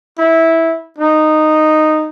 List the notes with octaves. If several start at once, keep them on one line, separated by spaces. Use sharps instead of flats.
E4
D#4